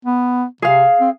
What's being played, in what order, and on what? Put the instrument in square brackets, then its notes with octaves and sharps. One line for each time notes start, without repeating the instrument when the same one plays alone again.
[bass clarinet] B3
[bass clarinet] C3 [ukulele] G#4 F5
[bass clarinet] C4